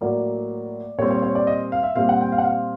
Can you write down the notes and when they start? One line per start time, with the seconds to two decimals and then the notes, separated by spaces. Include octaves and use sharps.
0.01 A2 F#3 A#3 D5
0.98 A#2 G3 C4 C#5
1.11 C#5
1.22 C#5
1.35 D5
1.47 D#5
1.72 F5
1.83 E5
1.96 A#2 G3 C4 F5
2.09 F#5
2.21 G5
2.32 F5
2.38 F#5
2.44 F5